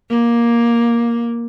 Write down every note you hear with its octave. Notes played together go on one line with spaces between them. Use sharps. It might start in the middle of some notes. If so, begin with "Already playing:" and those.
A#3